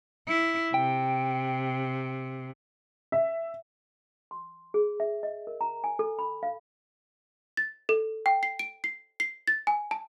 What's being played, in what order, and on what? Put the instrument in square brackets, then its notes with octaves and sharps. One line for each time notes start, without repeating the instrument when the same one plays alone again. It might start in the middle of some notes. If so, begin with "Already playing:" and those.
[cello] E4
[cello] C3 [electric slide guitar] G5
[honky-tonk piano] E5
[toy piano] C6
G#4
E5
D#5
A#4
A#5
G#5
A4
B5
F5
[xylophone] A6
A4
G5
C7
D7
C7
C7
A6
G#5
A5